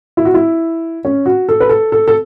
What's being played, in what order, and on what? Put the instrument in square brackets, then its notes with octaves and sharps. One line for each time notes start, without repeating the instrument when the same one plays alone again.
[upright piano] E4
F#4
E4
C#4
F#4
A4
B4
A4
A4
A4